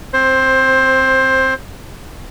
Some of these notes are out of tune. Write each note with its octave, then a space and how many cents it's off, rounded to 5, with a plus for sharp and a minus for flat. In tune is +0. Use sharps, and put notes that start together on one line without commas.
C4 +0 C5 +15